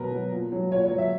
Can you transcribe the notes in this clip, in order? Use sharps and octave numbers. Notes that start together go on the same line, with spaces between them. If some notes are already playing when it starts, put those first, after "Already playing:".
Already playing: B2 F#3 A#4 B4
F#3
A#2
F#3
A#2 C#5
C#5
F#3
E5